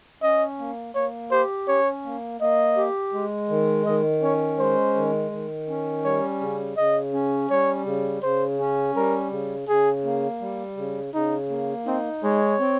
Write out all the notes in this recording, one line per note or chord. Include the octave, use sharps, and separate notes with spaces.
C#4 D#5
A#3
A#3 C#5
G4 C5
C#4 C#5
A#3
A#3 D#5
G4
G#3
D#3
D#3 D#5
C#4 C#5
G#3 C5
D#3
D#3
C#4
G3 C#5
C#3
C#3 D#5
C#4
G3 C#5
C#3
C#3 C5
C#4
G3 A#4
C#3
C#3 G#4
A#3
G3
C#3
C#3 D#4
A#3
C4 D#4
G#3 C#5
C4